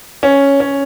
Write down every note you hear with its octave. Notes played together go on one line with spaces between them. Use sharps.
C#4
C#4